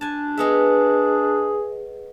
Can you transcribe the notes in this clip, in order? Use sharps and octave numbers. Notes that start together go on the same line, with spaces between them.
D4 G#5 A5
G#3 B3 G#4 E5